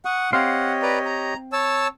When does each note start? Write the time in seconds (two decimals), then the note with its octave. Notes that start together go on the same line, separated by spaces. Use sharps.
0.05 F#5 C#6 D#6
0.33 C4 G4 C#5 D#5 F5 F#5 C6
0.82 B4 D5 A#5
1.05 A#5
1.52 C#5 A5 E6